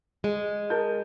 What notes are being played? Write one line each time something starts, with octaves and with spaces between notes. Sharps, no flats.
G#3
A#4 A5 G6